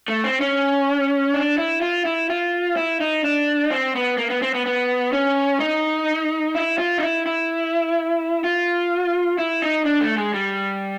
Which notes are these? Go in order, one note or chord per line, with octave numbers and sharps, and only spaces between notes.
A3
C4
C#4
D4
E4
F4
E4
F4
E4
D#4
D4
C4
B3
A#3
B3
C4
B3
B3
C#4
D#4
E4
F4
D#4
E4
E4
F4
E4
D#4
D4
A3
G#3
G3